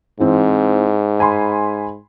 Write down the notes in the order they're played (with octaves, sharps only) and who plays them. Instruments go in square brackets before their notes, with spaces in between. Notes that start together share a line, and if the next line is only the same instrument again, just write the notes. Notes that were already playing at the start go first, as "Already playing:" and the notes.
[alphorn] G#2 [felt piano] E3 C4
[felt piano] G#5 B5 C6